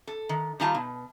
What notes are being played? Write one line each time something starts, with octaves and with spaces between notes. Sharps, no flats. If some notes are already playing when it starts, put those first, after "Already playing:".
A4
D#3
D#3 G3 D#4 F4 F5 A5
B2